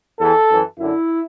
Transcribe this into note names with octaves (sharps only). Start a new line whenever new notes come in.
E2 E3 A4
F#2 E3
F#2 D3 E4